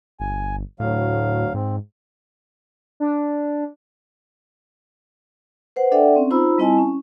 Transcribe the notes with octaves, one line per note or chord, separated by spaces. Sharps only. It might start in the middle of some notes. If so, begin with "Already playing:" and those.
G1 G#5
D2 A2 F#3 F5
G#2 C4
D4
B4 C5 F#5
D4 A4 D5 E5 F#5 G5
C4 C#4
D#4 F4 C5 A#5 B5 E6
G3 C4 E4 D#5 G#5 A5
C#4